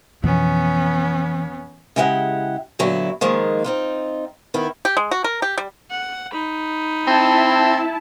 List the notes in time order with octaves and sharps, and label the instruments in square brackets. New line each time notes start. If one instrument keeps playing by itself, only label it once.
[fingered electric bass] F2 B2 [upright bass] E3 [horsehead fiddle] B3 C#4
[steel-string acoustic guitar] C#3 G#3 E4 G4 D#5 F#5
A#2 D3 F#3 B3 E4
D#3 F3 G#3 A#3
C4 D#4 F4
D#3 B3 E4
[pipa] G4
G#3
F#4
A#4
G4
G3
[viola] F#5
D#4 B5
[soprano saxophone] C4 [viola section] E4 A5